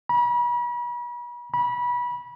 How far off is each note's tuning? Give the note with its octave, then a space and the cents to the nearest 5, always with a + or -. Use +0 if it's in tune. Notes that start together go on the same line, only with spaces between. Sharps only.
B5 -40
B5 -25